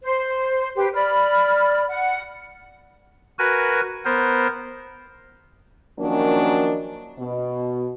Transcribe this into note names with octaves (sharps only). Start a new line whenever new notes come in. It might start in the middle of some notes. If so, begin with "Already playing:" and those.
C5
G4 B4 C5
D5 B5 F6
F#5
F#4 A#4 B4 G#5
B3 A#4 C5
D#3 F3 F#3 A#3 C#4 D4
B2